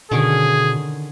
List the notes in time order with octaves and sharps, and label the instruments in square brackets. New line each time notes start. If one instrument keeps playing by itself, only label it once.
[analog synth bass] B2 [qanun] D3 D#3 C#4 [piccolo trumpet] G#4